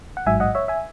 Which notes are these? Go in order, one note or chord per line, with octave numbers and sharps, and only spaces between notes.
F#5
A1 G#2 F#3 E5 G#5
D#5 F#5
C#5 E5
E5 G#5